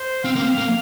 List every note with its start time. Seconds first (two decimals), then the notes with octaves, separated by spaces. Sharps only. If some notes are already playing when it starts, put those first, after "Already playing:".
Already playing: C5
0.25 C4 F5
0.36 A#3
0.42 C4
0.58 A#3